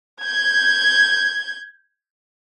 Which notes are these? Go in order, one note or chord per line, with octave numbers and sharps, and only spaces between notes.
G6 G#6